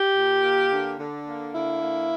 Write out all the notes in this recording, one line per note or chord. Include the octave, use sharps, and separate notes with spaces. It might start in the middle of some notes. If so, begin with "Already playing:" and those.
Already playing: G4
A#2
A#3
D3
D3
A#3
D3 E4
A#3